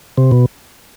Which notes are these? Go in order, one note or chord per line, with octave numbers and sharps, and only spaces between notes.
C3
B2